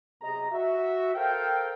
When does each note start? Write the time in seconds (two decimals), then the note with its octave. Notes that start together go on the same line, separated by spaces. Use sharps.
0.22 B1 C3 G#4 D#5 A#5
0.52 F#4 E5
1.15 A4 A#4 C5 F5 G5